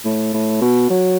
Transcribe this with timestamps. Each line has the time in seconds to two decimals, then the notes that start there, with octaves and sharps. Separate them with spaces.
0.05 A2
0.34 A2
0.61 B2
0.90 F#3